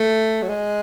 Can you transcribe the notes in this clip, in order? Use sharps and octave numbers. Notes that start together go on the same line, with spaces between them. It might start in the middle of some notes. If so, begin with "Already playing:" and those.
Already playing: A3
F#3
G#3